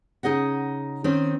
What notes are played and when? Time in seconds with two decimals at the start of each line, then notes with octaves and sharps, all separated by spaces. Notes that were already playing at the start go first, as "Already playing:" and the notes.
0.23 C#3 D#4 G#4 D#5 F#5
1.04 D#3 C4 C#4 D#4